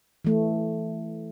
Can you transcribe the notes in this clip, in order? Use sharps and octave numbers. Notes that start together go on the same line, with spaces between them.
E3 A3